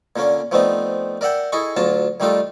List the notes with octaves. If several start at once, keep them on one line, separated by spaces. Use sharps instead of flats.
A#2 D3 A#3 C#4
F3 A3 B3 C4 D4 D#4
A#4 D5 E5 F#5 G5
E4 G#4 A4 D#5 C#6
D2 F#3 F4 A5 A#5
D#3 G3 A3 D#4 F4 A4